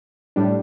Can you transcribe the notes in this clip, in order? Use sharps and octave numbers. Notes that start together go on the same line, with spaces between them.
A2 G3 D4